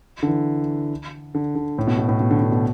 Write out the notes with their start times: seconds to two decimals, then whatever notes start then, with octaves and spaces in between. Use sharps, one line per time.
0.23 D3
0.27 E3
1.35 D3
1.55 D3
1.78 A2
1.87 B2
1.98 B2
2.09 A2
2.20 B2
2.31 D3
2.42 D3
2.52 B2